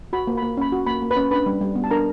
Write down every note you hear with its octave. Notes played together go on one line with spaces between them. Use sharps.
F#4 B5
A#3
A#3 B5
C#4 B5
F#4
A#3 B5
A#3
B4 B5
C#4
D4 B4 B5
G3
G3
B3
A5
D4 A#4 A#5